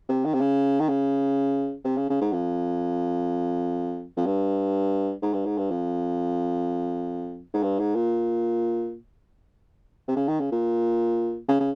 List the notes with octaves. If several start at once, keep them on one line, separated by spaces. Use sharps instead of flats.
C3
D#3
C3
C#3
D#3
C#3
C3
C#3
C#3
G#2
F2
F2
G2
G#2
G2
G#2
G2
F2
G#2
G2
G#2
A#2
C3
C#3
D#3
C#3
A#2
C#3
C#3